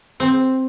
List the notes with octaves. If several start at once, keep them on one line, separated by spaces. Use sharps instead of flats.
C4